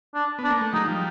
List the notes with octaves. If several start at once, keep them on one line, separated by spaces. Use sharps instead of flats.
D4
B3
D4
A#3
A3
F#3 G#3 D#4
F3 G3